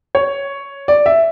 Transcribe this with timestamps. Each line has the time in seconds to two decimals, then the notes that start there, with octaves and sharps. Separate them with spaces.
0.15 C#5
0.88 D5
1.06 E5